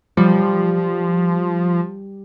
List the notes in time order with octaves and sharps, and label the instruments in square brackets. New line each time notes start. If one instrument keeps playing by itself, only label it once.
[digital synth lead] F3 [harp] G3